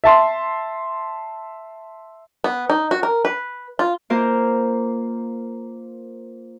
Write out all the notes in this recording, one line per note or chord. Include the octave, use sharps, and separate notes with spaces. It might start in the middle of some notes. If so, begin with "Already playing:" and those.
E5 A5 C6
B3
D#4
F#4
A#4
B4
F4
A#3 F4 A#4 C5 F5